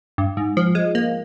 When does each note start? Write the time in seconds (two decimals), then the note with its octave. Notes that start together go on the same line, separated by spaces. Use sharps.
0.18 G2
0.37 G#2
0.57 F3
0.75 G#3
0.95 A#3